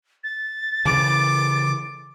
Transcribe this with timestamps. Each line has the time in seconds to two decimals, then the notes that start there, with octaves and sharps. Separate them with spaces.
0.24 A6
0.85 C#3 E3 D6